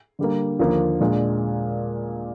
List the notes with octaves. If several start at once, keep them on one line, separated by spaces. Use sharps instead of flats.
D3 G3 A#3
D#2 D3 F3 A#3
A#2 G#3 D4